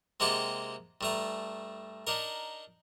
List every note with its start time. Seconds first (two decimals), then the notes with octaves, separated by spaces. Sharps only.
0.20 C3 G#3 A#3 G4 F#5 A5
1.01 G2 A3 A#5
2.07 D4 D#4 A#4